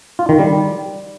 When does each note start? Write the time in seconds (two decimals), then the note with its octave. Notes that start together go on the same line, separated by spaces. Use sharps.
0.19 F4
0.29 D#3
0.39 G3